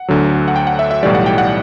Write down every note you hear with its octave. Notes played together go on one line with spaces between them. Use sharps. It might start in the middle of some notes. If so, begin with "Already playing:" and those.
Already playing: F#5
D2 D3 F#3
F#5
G5
F#5
E5
E5
B1 A2 E3 G3 D5
F#5
G5
F#5